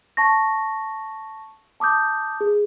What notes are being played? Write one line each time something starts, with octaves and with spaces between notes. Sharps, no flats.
A5 C#6 A#6
A5 D6 D#6 G6
G#4